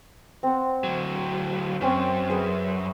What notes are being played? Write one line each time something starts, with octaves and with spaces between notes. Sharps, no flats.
C4 F#5
D2 F#3
F#2 C4 C#4 C6
G#4 B4 E5